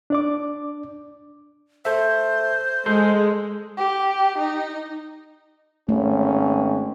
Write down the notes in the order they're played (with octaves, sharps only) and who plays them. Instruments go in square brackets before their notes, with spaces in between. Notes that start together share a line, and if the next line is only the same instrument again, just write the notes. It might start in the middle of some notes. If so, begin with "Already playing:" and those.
[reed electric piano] D4 D5 D6
[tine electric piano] A4 E5 [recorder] C5
[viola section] G#3 [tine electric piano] A4 C6
[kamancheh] G4
D#4
[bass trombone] G#1 [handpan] A3 [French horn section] C#4